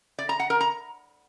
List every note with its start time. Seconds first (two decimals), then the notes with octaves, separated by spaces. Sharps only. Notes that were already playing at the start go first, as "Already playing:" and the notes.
0.19 D5
0.29 A#5
0.40 F#5
0.50 A#4
0.61 A#5